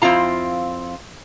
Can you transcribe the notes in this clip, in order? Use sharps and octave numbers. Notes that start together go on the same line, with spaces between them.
F2 C4 E4 F4 A#5